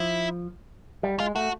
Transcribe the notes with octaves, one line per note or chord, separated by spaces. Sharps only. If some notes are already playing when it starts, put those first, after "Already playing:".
Already playing: F3 E4
G3
G#3 F4
A3 F#4